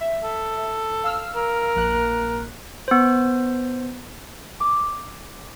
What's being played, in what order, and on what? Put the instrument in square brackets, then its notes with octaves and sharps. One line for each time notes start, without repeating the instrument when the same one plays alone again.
[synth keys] E5
[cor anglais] A4
[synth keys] F5 E6 F6
[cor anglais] A#4
[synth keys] A#1 A#3 F#6
[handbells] B3 C5
[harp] D6